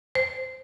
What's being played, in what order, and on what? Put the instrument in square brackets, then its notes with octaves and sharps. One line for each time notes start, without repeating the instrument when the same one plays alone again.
[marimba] C5